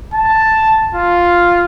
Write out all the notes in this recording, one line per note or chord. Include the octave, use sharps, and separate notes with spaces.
A5
F4